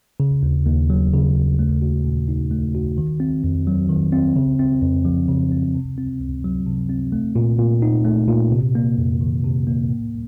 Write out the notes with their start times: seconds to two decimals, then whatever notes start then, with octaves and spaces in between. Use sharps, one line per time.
0.20 C#3
0.43 D#2
0.66 D#2
0.90 F#3
1.13 C#3
1.36 D#2
1.59 A3
1.82 F#4
2.04 A#2
2.28 D#4
2.51 A3
2.75 F#4
2.98 D#3
3.20 C4
3.44 F2
3.67 F#3
3.89 D#3
4.12 C4
4.36 C#3
4.59 C4
4.82 F2
5.05 F3
5.28 C#3
5.52 C4
5.75 C3
5.98 C4
6.20 C#2
6.44 F#3
6.67 C3
6.89 C4
7.12 A3
7.36 A#2
7.59 A#2
7.82 D#4
8.05 A3
8.28 A#2
8.52 C3
8.75 A#3
8.98 F2
9.21 D#3
9.45 C3
9.67 A#3
9.90 A2